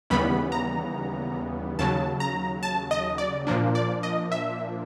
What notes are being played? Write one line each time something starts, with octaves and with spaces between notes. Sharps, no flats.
D#2 C#3 E3 G3 B3 B5
A#5
D#2 C#3 F#3 A5
A#5
A5
D#5
D5
A#2 F3 A#3 D4
D5
D#5
E5